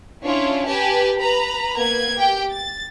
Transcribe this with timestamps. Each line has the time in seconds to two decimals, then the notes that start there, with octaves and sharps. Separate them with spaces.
0.24 C#4 D4 E4 F4 C#5
0.68 G4 B4 G#5 A5
1.20 B4 A#5 B5
1.77 A#3 B3 B4 G#6
2.17 G4 G5
2.51 A6